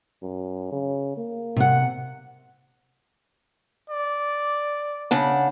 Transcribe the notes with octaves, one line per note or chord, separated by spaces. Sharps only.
F#2
C#3
A#3
C3 F#5
D5
C#3 D4 F#5